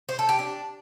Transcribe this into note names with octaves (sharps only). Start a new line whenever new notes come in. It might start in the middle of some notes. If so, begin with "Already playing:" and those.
C5
A4
G4
D4